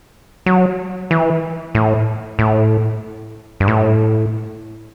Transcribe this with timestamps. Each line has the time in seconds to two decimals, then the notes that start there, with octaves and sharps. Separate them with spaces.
0.46 F#3
1.11 E3
1.75 A2
2.39 A2
3.60 G2
3.68 A2